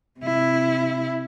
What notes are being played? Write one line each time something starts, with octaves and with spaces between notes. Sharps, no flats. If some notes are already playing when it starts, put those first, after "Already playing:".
C3 E4